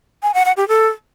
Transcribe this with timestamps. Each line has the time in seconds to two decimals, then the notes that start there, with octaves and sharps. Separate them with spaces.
0.23 G#5
0.34 F#5
0.45 F#5
0.57 G4
0.68 A4